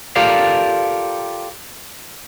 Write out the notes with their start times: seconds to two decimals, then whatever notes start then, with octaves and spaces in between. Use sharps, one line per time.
0.16 F4 G4 A4 A#4 D5 F5